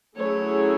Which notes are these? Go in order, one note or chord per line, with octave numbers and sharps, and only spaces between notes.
F#3 A3 C#4 E4 G#4 C#5